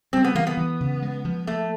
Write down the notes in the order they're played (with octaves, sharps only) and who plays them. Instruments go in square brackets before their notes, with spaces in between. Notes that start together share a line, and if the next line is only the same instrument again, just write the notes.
[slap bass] G3 [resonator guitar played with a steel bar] C4
[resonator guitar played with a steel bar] B3
[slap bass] E3 [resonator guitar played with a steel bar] A#3
[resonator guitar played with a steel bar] B3
[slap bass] E3
C#3
G#3
F3
[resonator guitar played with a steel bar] A3 [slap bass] A#3